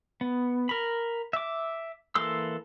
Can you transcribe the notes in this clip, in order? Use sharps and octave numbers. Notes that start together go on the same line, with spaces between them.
B3
A#4 B5
E5 D6
E3 A#3 A4 C6 E6